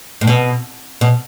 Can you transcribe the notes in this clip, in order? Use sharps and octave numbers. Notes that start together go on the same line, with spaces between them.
A2
B2
B2